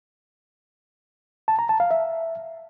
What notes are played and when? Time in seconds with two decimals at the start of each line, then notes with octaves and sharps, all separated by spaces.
1.48 A5
1.59 A#5
1.69 A5
1.80 F5
1.91 E5